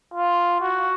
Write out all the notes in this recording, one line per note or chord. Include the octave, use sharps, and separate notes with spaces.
F4
F#4